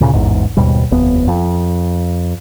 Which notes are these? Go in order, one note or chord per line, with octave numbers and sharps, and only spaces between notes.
D2 A#2 C#3
A1 E2 G#2
D#2 G#2 B2 G3
F1 D#2 B3
F2